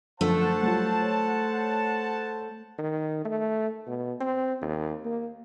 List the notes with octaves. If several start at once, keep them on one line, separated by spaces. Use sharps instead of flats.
F#2 D3 F3 A3 C5 F#5 A5
F#3 G3 F4
C#5
D#3
A3
B2
C4
D#2
A#3